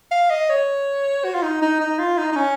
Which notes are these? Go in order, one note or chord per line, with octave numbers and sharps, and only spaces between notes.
F5
D#5
C#5
F#4
F4
D#4
D#4
D#4
F4
D#4
D#4
C#4